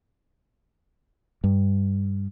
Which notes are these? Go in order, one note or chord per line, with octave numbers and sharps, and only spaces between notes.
G2